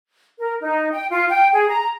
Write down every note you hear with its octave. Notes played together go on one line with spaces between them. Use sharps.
A#4
D#4
G5
F4
G5
G#4
A#5